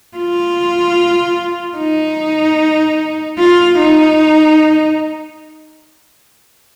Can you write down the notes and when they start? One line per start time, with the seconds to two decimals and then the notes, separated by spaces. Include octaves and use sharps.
0.17 F4
1.78 D#4
3.39 F4
3.79 D#4